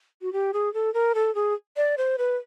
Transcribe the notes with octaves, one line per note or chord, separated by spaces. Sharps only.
F#4
G4
G#4
A4
A#4
A4
G#4
D5
C5
B4